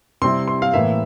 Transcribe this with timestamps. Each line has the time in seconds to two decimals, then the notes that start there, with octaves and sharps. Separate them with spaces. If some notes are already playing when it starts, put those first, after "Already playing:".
0.22 C3 G3 C4 E4 C6
0.48 C6
0.62 F5
0.74 A2 E3 A#3 E5